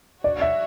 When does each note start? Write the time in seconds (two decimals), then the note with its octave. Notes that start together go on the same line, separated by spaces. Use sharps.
0.24 D4 F#4 C#5 D5
0.41 E5